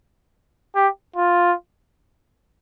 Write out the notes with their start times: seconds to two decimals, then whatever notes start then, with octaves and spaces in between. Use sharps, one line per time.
0.75 G4
1.16 F4